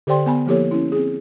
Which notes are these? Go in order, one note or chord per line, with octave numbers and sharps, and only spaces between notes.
D3 G4 C5 D5 G5 C6
B3 G#5 B5
F3 A#3 E4 G4 A4 C#5
C#4 E4
C4 G#4